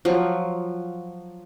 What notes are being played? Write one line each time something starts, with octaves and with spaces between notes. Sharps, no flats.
F3 F#3